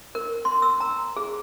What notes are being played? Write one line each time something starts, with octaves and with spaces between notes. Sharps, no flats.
A#4
C6
E6
A#5
G#4